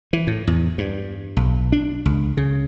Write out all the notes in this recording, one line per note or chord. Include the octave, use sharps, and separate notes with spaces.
E3
A2
E2
G2
B1
D4
C#2
C#3